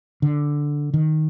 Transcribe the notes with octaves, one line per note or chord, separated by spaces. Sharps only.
D3
D#3